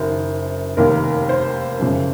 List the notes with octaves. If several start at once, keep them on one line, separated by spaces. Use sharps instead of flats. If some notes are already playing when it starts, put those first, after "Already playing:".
Already playing: F#1 F#2 D#3 C5
F1 D#2 D#3 A#4
C5
F#1 F2 C#3